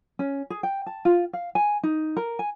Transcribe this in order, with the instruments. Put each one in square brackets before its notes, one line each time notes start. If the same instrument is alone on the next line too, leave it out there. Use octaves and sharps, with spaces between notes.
[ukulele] C#4
G#4
G5
A5
F4
F5
G#5
D#4
A#4
G#5